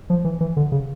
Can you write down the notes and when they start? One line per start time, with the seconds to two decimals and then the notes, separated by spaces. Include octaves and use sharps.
0.10 F3
0.24 E3
0.41 E3
0.57 D3
0.72 C#3